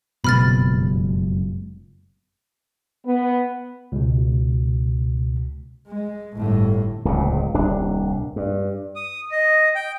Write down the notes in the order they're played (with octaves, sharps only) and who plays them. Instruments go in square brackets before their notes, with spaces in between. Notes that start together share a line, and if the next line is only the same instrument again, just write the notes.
[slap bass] F#1 F2 G#3 [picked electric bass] B2 [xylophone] B5 F6 A6
[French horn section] B3
[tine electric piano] C#2 B2
[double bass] G#3
G1 A2
[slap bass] D1 C#2 A#2
D#1 C2 D4
G2
[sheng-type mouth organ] D#6
D#5
G5